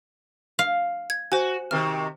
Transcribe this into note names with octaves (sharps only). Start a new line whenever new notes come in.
F5
G#6
F#4 C5 G#5
C3 D#3 F6